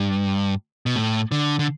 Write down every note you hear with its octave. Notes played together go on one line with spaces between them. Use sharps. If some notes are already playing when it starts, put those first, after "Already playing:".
Already playing: G2
B2
A2
D3
D3